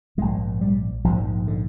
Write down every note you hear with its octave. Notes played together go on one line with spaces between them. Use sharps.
A#1 G#2 G#3
G3
A#1 G#2 F3
D3